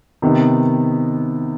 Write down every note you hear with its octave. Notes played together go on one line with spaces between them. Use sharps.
C3 D#3 B3 D#4